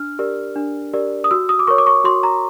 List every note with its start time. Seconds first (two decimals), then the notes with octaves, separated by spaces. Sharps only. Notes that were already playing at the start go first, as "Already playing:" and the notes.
Already playing: D4 F6
0.19 G4 A#4 D5
0.56 D4
0.93 G4 A#4 D5
1.24 D#6
1.31 F#4 E6
1.49 D#6
1.59 D6
1.67 A#4 C#5 C#6
1.78 D6
1.87 C#6
2.04 F#4 C6
2.23 A#5